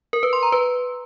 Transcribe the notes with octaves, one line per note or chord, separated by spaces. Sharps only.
A#4
B4
C6
A#5
B4